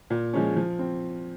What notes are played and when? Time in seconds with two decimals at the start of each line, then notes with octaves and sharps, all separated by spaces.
0.10 A#2
0.34 F3 G#3 C#4
0.56 F3
0.79 C4